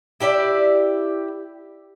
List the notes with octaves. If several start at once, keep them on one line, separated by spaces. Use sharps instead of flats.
E4 G4 D5 E5